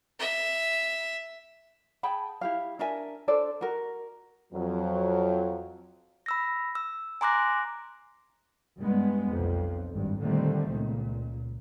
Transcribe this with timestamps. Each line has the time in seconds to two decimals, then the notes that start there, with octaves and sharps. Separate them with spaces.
0.20 E5
2.03 G#4 G5 A5 B5
2.41 E4 G4 F5
2.79 D4 A#4 E5 G#5
3.28 D4 A4 C5 D5
3.61 F#4 A#4
4.53 F2 F#3
6.26 B5 E6 A#6
6.75 E6
7.21 G#5 A#5 C6 D6 F#6 A#6
8.80 G2 G#3 B3
9.32 B1 F2
9.91 G#1 G2
10.20 A#2 D3 D#3 G3 A3 C4
10.68 C#2 A#2